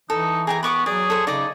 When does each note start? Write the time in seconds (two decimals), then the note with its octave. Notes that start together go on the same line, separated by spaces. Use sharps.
0.10 E3 D#4 A4
0.47 G#4 G5 G#5 A#5
0.63 B3 B5 C#6 D6
0.86 F#3 G#4 D5
1.10 A4 C5
1.27 C#3 D#4 D5 D#5 D6